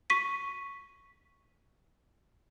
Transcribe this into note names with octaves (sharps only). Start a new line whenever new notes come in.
C#6 B6 D#7